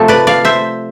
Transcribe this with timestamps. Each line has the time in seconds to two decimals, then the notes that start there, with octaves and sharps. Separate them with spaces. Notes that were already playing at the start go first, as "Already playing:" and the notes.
Already playing: C3 F3 A3 A4
0.08 B4 D5
0.27 D5 F5
0.45 C5 E5